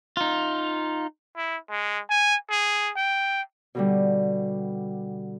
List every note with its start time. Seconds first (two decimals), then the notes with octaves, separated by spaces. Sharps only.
0.17 D#4 F4
1.36 E4
1.69 G#3
2.10 G#5
2.49 G#4
2.96 G5
3.75 B2 D3 G3